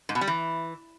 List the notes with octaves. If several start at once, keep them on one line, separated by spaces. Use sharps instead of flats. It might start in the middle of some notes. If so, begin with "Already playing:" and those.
G#2
B2
G3
E3